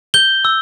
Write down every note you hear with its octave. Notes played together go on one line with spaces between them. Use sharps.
G6 G7
E6